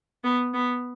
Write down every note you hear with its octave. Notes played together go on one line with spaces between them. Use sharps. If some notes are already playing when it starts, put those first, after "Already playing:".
B3
B3